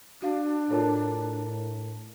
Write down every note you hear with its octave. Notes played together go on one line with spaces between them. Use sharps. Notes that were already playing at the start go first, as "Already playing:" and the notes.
D4 F#4 F5
A2 F4 A4 A#4 C#5 A5